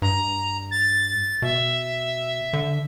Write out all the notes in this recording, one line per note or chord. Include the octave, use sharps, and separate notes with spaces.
G2 A#5
A6
B2 E5
D3